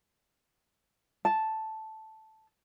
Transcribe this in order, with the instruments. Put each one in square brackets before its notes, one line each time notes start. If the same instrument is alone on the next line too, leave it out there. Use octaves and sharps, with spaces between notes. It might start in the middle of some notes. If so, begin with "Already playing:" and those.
[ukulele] A5